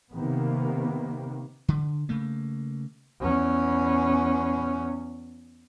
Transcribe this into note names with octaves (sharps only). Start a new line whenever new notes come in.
C3 D#3 A#3 B3
D3
C#3 A3 A#3
E2 C#4